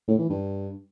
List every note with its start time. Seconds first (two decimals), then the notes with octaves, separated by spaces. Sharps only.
0.08 A2
0.18 E3
0.29 G2